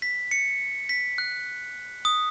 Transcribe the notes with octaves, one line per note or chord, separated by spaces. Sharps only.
B6
C#7
B6
F#6
D#6